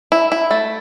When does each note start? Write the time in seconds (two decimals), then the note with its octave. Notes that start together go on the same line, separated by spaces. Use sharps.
0.12 E4
0.32 E4
0.51 A3